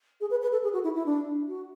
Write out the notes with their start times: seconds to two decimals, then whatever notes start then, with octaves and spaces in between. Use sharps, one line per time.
0.21 G#4
0.30 B4
0.42 B4
0.52 A4
0.63 G#4
0.73 F#4
0.84 E4
0.95 E4
1.06 D4
1.48 F#4